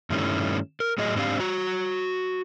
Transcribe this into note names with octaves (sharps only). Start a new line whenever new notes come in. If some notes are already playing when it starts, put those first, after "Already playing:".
G2 D#3 G3 A3 C#4 E4
A#4
A2 F#3 G#4 D#5
G#2 C4 D4 G4 F5
F#4 A#5